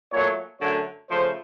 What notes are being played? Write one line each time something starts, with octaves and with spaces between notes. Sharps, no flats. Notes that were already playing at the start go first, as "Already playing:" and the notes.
A#2 F#3 A3 C#5
F#2 D3 F#3 A3 C#5
C#3 F3 A3 C5